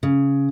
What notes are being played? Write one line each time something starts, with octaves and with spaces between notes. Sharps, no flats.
C#3